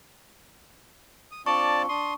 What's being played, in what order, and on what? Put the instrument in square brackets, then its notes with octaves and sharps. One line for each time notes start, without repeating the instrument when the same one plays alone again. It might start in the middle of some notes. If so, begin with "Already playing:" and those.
[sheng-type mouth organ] D#6
[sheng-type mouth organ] C4 D4 F4 [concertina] D5 A5 [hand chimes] C#6
[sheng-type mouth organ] D4 D#6 [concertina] C6